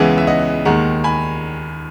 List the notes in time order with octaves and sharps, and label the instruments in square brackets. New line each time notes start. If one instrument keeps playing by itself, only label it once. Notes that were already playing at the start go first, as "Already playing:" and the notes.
Already playing: [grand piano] C#2 C#3 E3 G#3 B3 E5 G#5
E5
D#5 F#5
D#2 D#3 G#3 F#5 A#5
G#5 B5